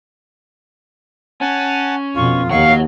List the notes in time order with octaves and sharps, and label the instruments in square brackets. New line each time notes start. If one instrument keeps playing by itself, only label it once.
[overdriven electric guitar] C#4 [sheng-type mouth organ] F#5 G#5 A5
[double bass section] F2 B2 [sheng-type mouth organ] F4 [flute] C#6
[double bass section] D#2 D#3 [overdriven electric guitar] C#5 F#5 [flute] F5 [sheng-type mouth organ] C#6